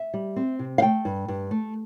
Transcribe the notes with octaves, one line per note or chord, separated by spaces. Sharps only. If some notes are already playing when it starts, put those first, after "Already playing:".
Already playing: E5
G3
C4
C3
F5
A3 G5
G2
G2
A3